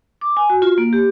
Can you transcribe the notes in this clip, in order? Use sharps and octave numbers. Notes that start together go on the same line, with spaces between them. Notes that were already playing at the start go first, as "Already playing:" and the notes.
D6
G#5
F#4
F4
A#3
G4